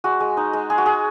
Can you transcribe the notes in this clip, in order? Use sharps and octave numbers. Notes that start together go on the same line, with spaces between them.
G#3 F#4
G#3
D#4
G#3
G#3 G#4
F#4
G#3 G#4